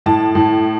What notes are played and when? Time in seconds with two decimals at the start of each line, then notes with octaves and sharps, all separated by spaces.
0.06 A2 A5
0.35 A2